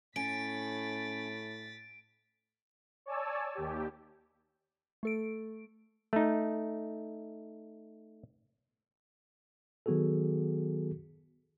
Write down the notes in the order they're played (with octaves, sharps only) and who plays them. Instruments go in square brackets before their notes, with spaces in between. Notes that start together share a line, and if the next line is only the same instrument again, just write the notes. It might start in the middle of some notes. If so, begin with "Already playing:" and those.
[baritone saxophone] A2 [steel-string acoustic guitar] C#4 [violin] A6 B6 [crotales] D7
[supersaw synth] C#5 D5 G#5 A5 E6
D#2 G4
[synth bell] A3 A4 D7
[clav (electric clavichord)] A3 D#4
[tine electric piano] D#3 F#3 B3 F#4 G#4 A4